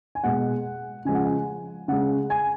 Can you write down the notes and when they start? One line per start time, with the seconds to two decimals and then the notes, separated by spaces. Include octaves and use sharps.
0.15 G#5
0.24 B2 G#3 F#5
1.05 C#3 F3 G#3 G#5
1.15 F#5
1.25 G#5
1.88 C#3 G#3 F#5
2.30 G#5